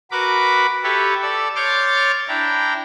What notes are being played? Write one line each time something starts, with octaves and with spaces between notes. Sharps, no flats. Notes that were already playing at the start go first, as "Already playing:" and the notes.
F#4 A#4 B4 B5 D6
G4 A4 B4 C#5 E5
A4 D5 E6
C#5 C6 D6 F6 G6 A6
D4 E4 G5 A#5